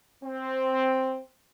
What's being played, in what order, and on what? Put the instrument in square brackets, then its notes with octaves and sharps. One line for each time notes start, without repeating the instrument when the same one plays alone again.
[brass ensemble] C4